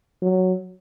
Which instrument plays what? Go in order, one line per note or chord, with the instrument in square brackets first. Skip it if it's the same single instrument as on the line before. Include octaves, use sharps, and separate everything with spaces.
[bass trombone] F#3